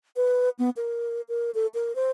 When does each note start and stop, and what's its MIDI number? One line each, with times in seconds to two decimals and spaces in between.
0.16 0.50 71
0.59 0.70 59
0.77 1.21 70
1.29 1.51 70
1.55 1.67 69
1.74 1.95 70
1.95 2.11 72